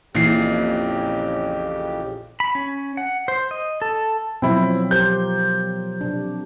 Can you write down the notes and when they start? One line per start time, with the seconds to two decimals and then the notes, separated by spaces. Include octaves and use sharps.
0.15 A#1 F2 C#3 E3 G4 C7
2.40 B5
2.55 C#4
2.97 F#5
3.28 C5
3.51 D#5
3.82 A4
4.42 B2 F3 F#3 C4 E4
4.91 G4 A#4 C5 G6
6.01 C3 D4